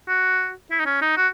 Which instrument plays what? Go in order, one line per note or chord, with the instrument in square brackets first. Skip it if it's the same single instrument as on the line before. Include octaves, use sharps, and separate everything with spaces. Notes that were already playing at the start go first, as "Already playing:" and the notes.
[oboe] F#4
E4
D#4
C#4
D#4
F#4